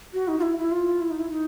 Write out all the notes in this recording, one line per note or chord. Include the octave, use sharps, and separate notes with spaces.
F#4
D#4
F4
E4
E4
F4
E4
D#4
E4
D#4